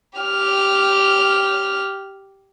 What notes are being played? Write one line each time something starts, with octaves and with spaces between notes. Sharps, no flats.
G4 F6